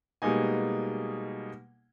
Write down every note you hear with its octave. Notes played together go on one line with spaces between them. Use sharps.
B2 G3 G#3 A#3 D#4 G#5